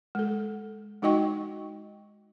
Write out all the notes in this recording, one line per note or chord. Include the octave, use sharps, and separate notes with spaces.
G#3 A4
G#3 D#4 F#4 D#5 G5 C#6